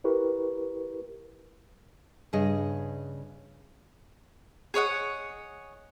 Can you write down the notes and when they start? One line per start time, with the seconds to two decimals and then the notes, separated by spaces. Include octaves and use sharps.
0.04 E4 G4 A#4 B4 C#6
2.33 G2 C#3 G#4 D#5
4.74 G#4 C#5 D#5 F#5